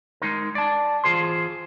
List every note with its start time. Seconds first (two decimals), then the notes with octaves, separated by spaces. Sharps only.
0.22 G#3 D#4 A#4
0.55 D5 A5
1.04 E3 F4 G#4 C5 C6